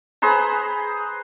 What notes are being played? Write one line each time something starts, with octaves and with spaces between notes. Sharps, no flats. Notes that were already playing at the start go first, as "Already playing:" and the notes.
G#4 B4 C5 A#5